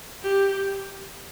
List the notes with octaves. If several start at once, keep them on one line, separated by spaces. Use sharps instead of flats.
G4